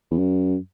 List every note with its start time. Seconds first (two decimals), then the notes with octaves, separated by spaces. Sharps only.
0.11 E2
0.18 F#2